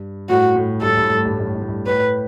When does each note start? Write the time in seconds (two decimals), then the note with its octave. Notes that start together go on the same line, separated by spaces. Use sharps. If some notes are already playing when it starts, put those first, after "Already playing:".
Already playing: G2
0.29 A2 F#4
0.56 A2
0.82 G2 A4
0.90 A2
0.97 G2
1.03 A2
1.10 G2
1.18 A2
1.25 G2
1.32 A2
1.40 G2
1.47 A2
1.54 G2
1.62 A2
1.69 G2
1.87 A2 B4